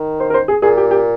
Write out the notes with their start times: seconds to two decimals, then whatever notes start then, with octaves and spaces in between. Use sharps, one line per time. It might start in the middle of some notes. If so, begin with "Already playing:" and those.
Already playing: D#3
0.20 C5
0.30 A#4
0.34 C5
0.48 G#4
0.62 A#2 G#4
0.77 G4
0.91 G4